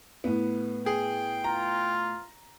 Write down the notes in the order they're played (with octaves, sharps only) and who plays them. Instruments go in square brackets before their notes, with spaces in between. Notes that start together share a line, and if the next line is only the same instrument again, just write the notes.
[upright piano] A2 B3
[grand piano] G#4 [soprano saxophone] G5
[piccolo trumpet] F4 [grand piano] A#5